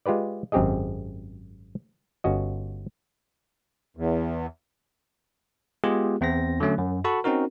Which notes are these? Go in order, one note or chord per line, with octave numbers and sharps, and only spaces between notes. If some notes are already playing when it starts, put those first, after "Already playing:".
G#3 F4 G4 B4 D5
G#1 F#2 C4 G4 G#4 D#5
G1 C#4 F#4 D#5
E2
G#3 B3 F4 G4 G#4
E2 C4 C5 A#6
D3 F#3 A3 C#4
F#2
F#4 A4 F#5 A5 B5 C#6
C4 C#4 D#4 F#4 A#4